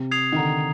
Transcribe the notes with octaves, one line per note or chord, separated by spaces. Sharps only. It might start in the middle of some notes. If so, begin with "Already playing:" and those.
Already playing: C3
D#6 G#6 C7 F7
D#3
D3 A#5